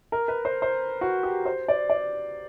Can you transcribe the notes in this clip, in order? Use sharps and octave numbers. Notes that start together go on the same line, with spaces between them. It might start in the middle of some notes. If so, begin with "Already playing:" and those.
A#4
B4
C5
C5
F#4
G4
C5
D5
D5